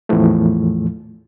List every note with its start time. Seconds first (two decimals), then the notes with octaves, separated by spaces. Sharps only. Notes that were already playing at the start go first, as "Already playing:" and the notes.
0.09 E2 A2 E3 F3 A3